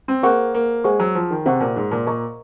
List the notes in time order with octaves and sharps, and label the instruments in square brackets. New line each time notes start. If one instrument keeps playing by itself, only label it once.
[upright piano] C4
[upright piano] A#3 [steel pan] G#4 C5 F#5 C#6
[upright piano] A#3
[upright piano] G#3 [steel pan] G#4 C5 F#5 C#6
[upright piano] F#3
F3
D#3
[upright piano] C3 [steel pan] G#4 C5 F#5 C#6
[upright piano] A#2
G#2
A#2
[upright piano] A#2 [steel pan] A#4 D#5 A#5 C#6